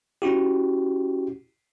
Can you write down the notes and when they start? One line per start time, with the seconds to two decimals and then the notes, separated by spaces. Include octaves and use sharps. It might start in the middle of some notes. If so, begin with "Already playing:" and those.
0.22 C#4 E4 F#4 G4